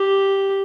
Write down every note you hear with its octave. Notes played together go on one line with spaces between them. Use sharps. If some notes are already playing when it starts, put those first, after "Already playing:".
Already playing: G4